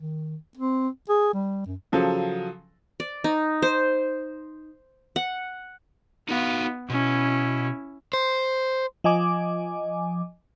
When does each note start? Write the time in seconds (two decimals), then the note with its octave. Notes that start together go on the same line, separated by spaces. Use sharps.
0.01 D#3
0.57 C4
1.09 G#4
1.34 G3
1.66 F#2
1.92 C#3 F3 F#3 A4
3.00 D5
3.24 D#4
3.62 C5
5.16 F#5
6.29 B3 D#4 F#4 F5
6.90 B2 C#4 E4
8.13 C5
9.04 F3 D#5 G#5 D6